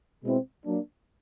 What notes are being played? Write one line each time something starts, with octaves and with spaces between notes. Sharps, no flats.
B2 G#3 C4 E4
F#3 A#3 D4